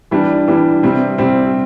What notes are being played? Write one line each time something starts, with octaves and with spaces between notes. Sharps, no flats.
E3 G3 D4
E3 G3 D4
C3 G3 C4
C3 G3 C4